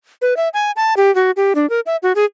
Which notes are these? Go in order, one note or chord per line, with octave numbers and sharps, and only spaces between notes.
B4
E5
G#5
A5
G4
F#4
G4
D4
A#4
E5
F#4
G#4